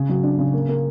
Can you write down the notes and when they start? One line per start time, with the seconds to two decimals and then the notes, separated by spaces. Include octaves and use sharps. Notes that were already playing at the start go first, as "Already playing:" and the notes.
Already playing: C#3
0.09 F#3
0.23 D4
0.39 C#3
0.53 A#3
0.69 A#3